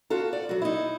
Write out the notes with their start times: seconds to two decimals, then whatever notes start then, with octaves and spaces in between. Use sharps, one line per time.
0.10 F4 F#4 A4
0.33 D5
0.49 F#3 F#4
0.62 D#4 E4